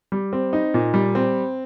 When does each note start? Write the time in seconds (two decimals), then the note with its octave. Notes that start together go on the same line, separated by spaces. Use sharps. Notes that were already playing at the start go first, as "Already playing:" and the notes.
0.12 G3
0.33 C4
0.53 D#4
0.74 A#2
0.94 G3
1.15 C4